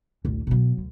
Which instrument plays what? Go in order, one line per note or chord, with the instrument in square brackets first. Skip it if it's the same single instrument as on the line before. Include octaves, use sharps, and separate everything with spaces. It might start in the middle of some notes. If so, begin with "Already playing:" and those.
[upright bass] A1 D2
B2 F#3
D2